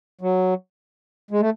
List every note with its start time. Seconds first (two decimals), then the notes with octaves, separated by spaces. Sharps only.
0.21 F#3
1.31 G#3
1.40 A3